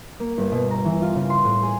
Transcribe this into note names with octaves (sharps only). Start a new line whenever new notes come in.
A#3
G1
B2
A#5
E3
F4
C#3
C6
A2
G#4